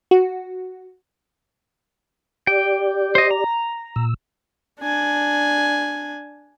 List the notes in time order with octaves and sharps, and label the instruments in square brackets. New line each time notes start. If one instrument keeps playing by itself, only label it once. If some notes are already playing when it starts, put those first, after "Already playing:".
[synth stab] F#4
[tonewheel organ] G4 D5 [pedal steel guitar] G5
[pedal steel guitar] C5 D#5
A#5
[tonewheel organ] A#2 E6
[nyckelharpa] D4 G#5